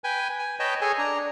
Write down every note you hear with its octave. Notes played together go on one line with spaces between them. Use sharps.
B4 G5 G#5
G#5
B4 C#5 D#5 G5 A5
G#4 A4 C#5 G#5
D4 A#5